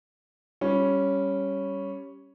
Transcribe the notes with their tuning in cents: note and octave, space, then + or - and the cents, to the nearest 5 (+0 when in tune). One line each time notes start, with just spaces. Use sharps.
G3 +0 C#4 +0